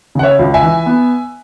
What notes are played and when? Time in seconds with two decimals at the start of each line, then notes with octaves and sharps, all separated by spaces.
0.15 C#3 F#5
0.23 C#5 E5
0.39 C#2
0.54 E5 G#5
0.63 E3
0.86 B3